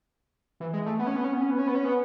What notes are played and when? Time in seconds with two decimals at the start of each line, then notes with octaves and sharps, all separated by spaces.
0.60 E3
0.73 G#3
0.86 A3
0.99 B3
1.07 C#4
1.16 B3
1.24 C#4
1.33 B3
1.41 C#4
1.50 B3
1.58 C#4
1.67 B3
1.75 C#4
1.84 B3